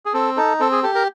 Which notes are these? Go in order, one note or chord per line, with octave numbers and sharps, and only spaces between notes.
G#4
C4 A4
D#4 A4
C4 A4
G#4
G4 A4
A#4